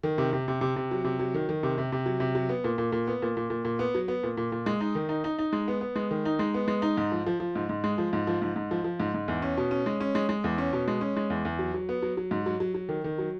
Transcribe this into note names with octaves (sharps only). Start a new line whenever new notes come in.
D#3
C3
C3
C3
C3
C3
F#3
C3
F#3
D#3
D#3
C3
C3
C3
F#3
C3
F#3
B3
A#2
A#2
A#2
B3
A#2
A#2
A#2
A#2
B3
F#3
B3
A#2
A#2
A#2
G#3
D#4
D#3
D#4
D#4
D#4
G#3
B3
B3
G#3
D#3
D#4
G#3
B3
G#3
D#4
G#2
F3
F3
F3
G#2
G#2
G#3
F3
G#2
F3
G#2
G#2
F3
F3
G#2
G#2
E2
C#4
B2
C#4
G#3
C#4
G#3
G#3
E2
C#4
B2
G#3
C#4
G#3
E2
E2
F#3
F#3
B3
F#3
F#3
G#2
F#3
F#3
F#3
D#3
D#3
F#3